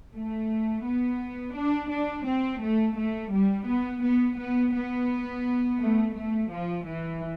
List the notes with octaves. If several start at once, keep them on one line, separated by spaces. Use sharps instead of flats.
A3
B3
D4
D4
C4
A3
A3
G3
B3
B3
B3
B3
A3
A3
F3
E3